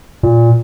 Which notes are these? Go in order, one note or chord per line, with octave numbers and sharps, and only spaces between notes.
A#2